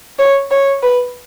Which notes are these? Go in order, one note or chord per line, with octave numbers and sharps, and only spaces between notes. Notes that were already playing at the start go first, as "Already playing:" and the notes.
C#5
C#5
B4